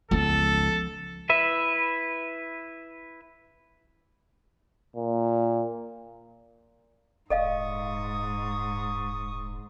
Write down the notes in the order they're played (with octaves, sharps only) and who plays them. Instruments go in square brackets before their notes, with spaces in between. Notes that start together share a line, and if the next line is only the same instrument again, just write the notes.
[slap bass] C#2 [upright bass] F3 B3 [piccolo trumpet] A4
[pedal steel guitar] E4 B4 E5
[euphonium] A#2
[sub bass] D#1 [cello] G#2 [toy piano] A4 D#5 F5 [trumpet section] C#6 D#6